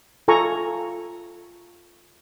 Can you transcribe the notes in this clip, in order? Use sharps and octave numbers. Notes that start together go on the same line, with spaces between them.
F4 A4 G#5 A#5 C#6